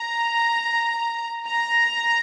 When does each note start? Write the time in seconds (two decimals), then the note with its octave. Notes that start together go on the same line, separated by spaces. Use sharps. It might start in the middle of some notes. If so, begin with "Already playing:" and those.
Already playing: A#5
1.45 A#5